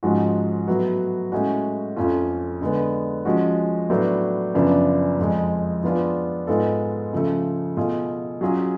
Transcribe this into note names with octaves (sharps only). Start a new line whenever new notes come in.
G#2 F3 G#3 C#4 F#4
A2 F#3 B3 F#4
A2 G#3 C#4 F#4
F2 F3 A3 C#4 F4
D3 G#3 B3
F3 G#3 C#4 F#4
A2 F#3 B3 D4
F#2 C#3 F3 B3 D4
F2 F3 G#3
F3 B3 D4 F4 G#4
G#2 G#3 B3 F4 A4
C#3 F3 A3
B2 A3 F4 G#4
F#3 C#4 F4 G#4